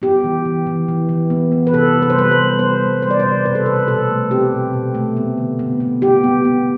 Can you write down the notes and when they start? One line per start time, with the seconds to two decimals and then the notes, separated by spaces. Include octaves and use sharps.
0.02 B3 G4
0.24 E3
0.45 E3
0.67 E3
0.88 E3
1.09 E3
1.30 B3
1.52 B3
1.67 B4
1.74 C3 A4
1.95 G3
2.02 B4
2.10 C5
2.17 G3 B4
2.31 C5
2.38 G3
2.59 B3 C5
2.81 G3
3.02 G3 C5
3.11 D5
3.20 C5
3.23 C3
3.45 B2 B4
3.55 A4
3.66 B2 B4
3.88 B2 A4
4.10 A3
4.31 C4 G4
4.52 B2
4.73 B2
4.95 A3
5.17 B3
5.37 D3
5.59 B3
5.80 B3
6.02 B3 G4
6.24 B3
6.45 B3